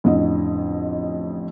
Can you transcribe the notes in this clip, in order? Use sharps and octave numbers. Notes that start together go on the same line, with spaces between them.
A1 F2 D3 D#5